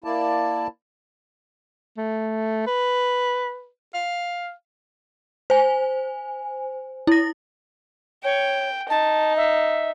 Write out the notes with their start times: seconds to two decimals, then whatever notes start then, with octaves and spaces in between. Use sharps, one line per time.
0.04 A#3 E4 D5 A5
1.98 A3
2.67 B4
3.94 F5
5.50 C5 G#5
7.07 E4 A#6
8.24 C#5 G5
8.90 D#4 A5
9.36 E5